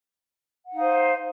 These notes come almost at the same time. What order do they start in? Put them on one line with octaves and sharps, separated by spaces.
F#5 D#4 F5 C5